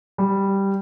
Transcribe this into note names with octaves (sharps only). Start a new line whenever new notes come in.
G3